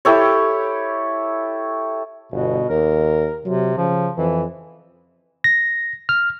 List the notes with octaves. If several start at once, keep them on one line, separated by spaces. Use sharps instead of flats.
E4 G4 A4 C#5
G1 B2
D#2 A#4
C3 F#3
C#3 F3
F2 E3
A#6
F6